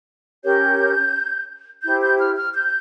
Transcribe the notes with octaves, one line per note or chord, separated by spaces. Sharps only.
C#4 G4 A#4 C#5 G6
E4 G4 C5 G6
G6
F6
F6
G6